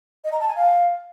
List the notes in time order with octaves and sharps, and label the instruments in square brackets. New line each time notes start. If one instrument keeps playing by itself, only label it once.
[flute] D#5
A#5
A5
G#5
F5